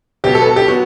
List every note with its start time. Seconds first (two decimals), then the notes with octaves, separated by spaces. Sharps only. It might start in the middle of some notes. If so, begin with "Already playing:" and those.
0.24 B2 F#3 B3 G4
0.35 A4
0.42 B4
0.46 A4
0.56 G4
0.68 F#3 B3 F#4